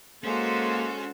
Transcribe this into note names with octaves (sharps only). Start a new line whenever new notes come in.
G#3 A#3 C#4 F#4 A4 C5